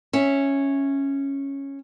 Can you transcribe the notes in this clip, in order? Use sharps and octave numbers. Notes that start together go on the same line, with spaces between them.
C#4 E5